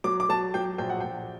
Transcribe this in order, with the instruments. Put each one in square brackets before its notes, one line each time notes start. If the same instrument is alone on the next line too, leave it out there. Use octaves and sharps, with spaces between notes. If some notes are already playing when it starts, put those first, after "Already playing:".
[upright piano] F#3 D6
D6
F#3 A5
F#3 G5
A#1 G5
F#5
A#1 G5